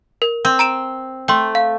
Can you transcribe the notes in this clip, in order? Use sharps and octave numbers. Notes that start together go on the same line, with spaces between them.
A#4
C4
A#5 D7 E7
A3 G5 C6
F5